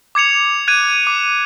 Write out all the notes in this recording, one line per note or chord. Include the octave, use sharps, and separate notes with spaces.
D6 G#6 C#7 F7
F#6 G#6 D#7
D6